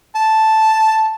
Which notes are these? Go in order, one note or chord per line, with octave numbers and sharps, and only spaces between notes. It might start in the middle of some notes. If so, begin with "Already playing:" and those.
A5